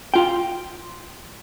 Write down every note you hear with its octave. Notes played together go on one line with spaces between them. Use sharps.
F4 G5